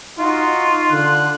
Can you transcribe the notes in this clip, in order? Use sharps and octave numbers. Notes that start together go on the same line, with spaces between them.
D#4 F4 F#4
D3 F#6